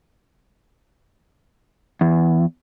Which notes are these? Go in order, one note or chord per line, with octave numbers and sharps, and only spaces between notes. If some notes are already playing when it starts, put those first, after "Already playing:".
E2